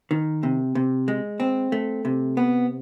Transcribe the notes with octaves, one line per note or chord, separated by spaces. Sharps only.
D#3
C3
C3
G#3
C4
A3
C3
B3